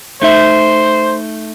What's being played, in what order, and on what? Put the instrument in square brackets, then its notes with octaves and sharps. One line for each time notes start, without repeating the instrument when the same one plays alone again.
[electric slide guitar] A3 D#4 E5 [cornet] C5